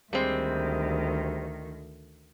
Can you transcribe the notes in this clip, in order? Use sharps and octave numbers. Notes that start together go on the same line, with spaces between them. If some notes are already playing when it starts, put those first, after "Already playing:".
D2 D#3 G3 G#3 C4